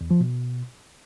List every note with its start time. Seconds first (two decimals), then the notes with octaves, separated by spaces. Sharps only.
0.01 E2
0.11 F3
0.20 B2